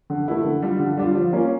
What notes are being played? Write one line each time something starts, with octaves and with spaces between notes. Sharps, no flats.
D3
A3 E4
D3
G3 D4 F4
D3
G3 D4 F4
F3
A#3 C#4 F4